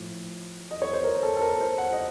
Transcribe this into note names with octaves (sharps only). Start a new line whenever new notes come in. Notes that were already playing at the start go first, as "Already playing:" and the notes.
Already playing: A2 F3
D#5
C#5
C5
A#4
A4
A4
A#4
C5
F#5
D#5